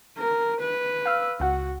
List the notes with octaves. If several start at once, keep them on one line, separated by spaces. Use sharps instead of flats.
A#4
B4
F5 E6 F6
C#2 F#4 F#5